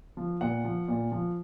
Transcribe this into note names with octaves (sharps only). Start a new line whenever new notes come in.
F3
A#2 F#5
F3
A#2
F3